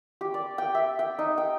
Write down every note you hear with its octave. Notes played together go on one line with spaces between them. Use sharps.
G4
D5
G5
E5
G5
D#4
G5